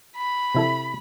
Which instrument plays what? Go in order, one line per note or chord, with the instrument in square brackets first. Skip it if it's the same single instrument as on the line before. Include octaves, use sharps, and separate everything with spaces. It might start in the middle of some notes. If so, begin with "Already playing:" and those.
[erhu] B5
[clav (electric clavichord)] C3 E4 A4